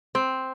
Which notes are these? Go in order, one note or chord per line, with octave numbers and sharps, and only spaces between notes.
C4